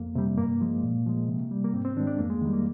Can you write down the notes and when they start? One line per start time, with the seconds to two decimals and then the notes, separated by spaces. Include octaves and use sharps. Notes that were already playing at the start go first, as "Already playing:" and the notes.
Already playing: F2 A#3
0.15 C3 G3
0.38 G2 A#3
0.61 F3 G#3
0.83 A#2
1.06 F3 G#3
1.28 C3
1.51 G3
1.64 A#3
1.73 G#2 C4
1.85 C4
1.96 D#3 D4
2.00 G#3
2.07 D4
2.18 F2 A#3
2.30 G#3
2.41 D#3 G3
2.53 A#3